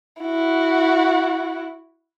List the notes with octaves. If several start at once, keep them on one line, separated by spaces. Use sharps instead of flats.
E4 F#4